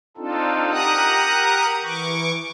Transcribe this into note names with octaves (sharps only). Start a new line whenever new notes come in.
C4 D4 D#4 F4 A4
G4 A#4 F#5 A#5 D#6 F#6
E3 C#6 D6